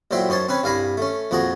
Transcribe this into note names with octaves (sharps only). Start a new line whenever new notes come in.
A1 A#2 F#3 C5 E5 G5
F#2 D#4 C5 C#5 A5
C4 C#4 B4 C#5
C2 G2 F5 G#5 A#5 B5
A3 C#4
A#1 F2 F3 F#4 G#4 A#5